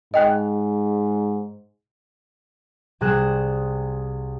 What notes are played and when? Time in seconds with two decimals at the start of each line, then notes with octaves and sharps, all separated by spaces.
0.14 G#2 D#5 G5 F#6
3.01 C2 C3 G#4 F#6 E7